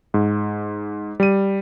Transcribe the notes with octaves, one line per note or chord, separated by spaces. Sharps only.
G#2
G3 D#7